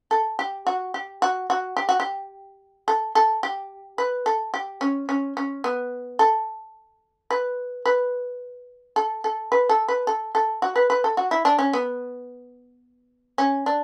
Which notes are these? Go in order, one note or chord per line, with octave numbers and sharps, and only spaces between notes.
A4
G4
F#4
G4
F#4
F#4
G4
F#4
G4
A4
A4
G4
B4
A4
G4
C#4
C#4
C#4
B3
A4
B4
B4
A4
A4
B4
A4
B4
A4
A4
F#4
B4
B4
A4
F#4
E4
D4
C#4
B3
C#4
D4